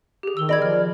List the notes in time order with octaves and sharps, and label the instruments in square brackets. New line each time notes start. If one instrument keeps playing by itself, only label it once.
[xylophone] G4 G#4
[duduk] D#3 [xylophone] E6 G7
[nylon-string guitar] D5 [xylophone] D#5 B5 G#6
[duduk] F3 [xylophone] F6